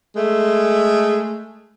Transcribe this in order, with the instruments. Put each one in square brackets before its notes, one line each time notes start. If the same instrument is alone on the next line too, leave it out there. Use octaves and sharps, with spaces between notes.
[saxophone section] G#3 A3